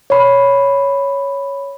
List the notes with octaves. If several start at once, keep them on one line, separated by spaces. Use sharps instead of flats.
C#5 B5